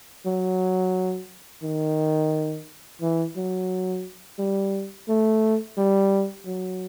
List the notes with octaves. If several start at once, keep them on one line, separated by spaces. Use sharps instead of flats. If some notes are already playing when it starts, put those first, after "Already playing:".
F#3
D#3
E3
F#3
G3
A3
G3
F#3